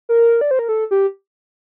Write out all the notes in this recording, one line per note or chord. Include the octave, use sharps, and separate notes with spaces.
A#4
D5
C5
A#4
A4
G4